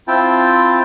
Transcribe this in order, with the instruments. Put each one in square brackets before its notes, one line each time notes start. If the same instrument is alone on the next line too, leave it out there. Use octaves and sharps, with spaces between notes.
[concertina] C4 E4 F4 G5 A5